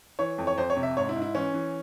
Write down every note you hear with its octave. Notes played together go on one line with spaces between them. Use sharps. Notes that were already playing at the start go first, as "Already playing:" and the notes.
E3 C#5
F2
C#5
F2 C5
C#5
C3
E5
G#2 C#5
E4
G#2
E4
E3 C#4
E3